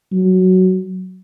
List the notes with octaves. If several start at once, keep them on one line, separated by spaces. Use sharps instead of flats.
F#3